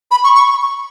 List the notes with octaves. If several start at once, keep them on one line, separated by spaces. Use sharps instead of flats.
B5
C#6
C#6